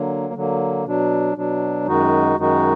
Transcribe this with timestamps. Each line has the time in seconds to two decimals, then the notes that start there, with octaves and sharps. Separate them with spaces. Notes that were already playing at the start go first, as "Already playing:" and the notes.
Already playing: D3 F#3 A#3
0.34 D3 F#3 A#3
0.85 B2 F#3 D4
1.36 B2 F#3 D4
1.87 F#2 D#3 G#3 D#4 F#4
2.37 F#2 D#3 G#3 D#4 F#4